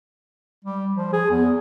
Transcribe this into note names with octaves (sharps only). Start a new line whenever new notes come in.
G3
F3
G#4
E2